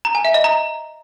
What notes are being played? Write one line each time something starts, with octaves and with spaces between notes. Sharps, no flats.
A#5
G#5
E5
D#5
A#5